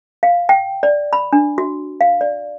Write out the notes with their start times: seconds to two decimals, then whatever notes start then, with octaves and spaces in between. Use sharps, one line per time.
0.23 F5
0.49 G5
0.83 D5
1.13 B5
1.33 D4
1.58 F#4
2.01 F5
2.21 D5